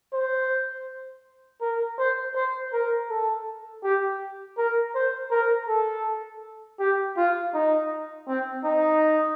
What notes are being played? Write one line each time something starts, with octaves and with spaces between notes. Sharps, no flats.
C5
A#4
C5
C5
A#4
A4
G4
A#4
C5
A#4
A4
G4
F4
D#4
C4
D#4